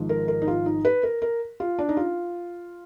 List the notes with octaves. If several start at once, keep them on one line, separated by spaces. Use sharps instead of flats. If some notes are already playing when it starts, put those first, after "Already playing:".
Already playing: G#1 G#2 F3 G#3
A#4
A#4
D#4
F4
D#4
B4
A#4
A#4
F4
D4
D#4
F4